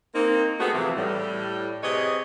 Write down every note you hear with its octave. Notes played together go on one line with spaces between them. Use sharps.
A#3 C4 D#4
G#3 A3 B3 C4 F#4 G#4
A2 C3 E3 F3
A2 G3
C3 G#4 B4 C#5 D#5